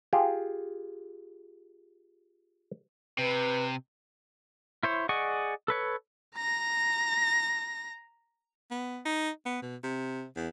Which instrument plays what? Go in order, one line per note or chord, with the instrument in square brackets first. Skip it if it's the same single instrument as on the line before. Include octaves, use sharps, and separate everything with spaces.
[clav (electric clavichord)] F4 G4 G#4
[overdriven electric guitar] C3 [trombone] B4
[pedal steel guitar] E4 C5 C#5
G#4 D5 D#5 F#5 C#6
A4 B4 C#5
[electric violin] A#5 A#6
[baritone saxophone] B3
D#4
B3
B2
C3
E2